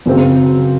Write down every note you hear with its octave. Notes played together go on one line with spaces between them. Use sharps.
F#2 C#3 F#3 C4